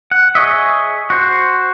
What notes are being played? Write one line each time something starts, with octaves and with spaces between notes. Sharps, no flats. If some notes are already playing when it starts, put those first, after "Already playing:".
F#5
G#4 C#5 D#5 E5
F#4 C5